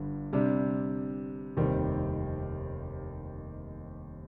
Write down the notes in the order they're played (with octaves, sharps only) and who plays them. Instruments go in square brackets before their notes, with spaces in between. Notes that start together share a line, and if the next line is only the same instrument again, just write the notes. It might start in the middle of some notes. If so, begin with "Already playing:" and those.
Already playing: [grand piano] G1 G2
C3 G3 D4
F1 D#2 D#3 G3 C4